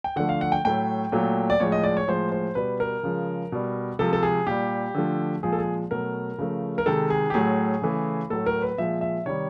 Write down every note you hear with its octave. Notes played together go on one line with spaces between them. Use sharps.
G5
D3 F3 A3 F#5
F5
F#5
G5
A2 F#3 A3 G5
A#2 F#3 A3
D5
A2 F3 G#3 C#5
D#5
D5
C#5
A2 F3 G#3 C5
C5
B2 G3 B4
A#4
C#3 F3 G#3
B2 G3
C3 F3 G#3 A4
A4
G#4
A#2 G3 G4
D3 F3 A3
A#2 F3 G#3 G#4
A4
G#4
B2 F#3 A3 A#4
C#3 F3 A3
A#4
C3 D#3 G#3 A4
G#4
G4
A2 F#3 A3 G#4
C#3 E3 A3
A2 F#3 A3 A4
A#4
B4
A#2 F3 G#3 E5
E5
C3 D#3 G3 C#5